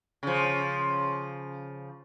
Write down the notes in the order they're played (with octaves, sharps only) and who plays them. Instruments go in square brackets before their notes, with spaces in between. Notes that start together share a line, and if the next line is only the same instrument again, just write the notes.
[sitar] C#3 F3